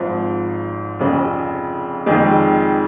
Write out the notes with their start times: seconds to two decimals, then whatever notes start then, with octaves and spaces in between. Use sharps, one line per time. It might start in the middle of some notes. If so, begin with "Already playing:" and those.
Already playing: G#1 G#2 F3
0.99 F1 F2 C#3
2.06 F1 F2 D#3 G#3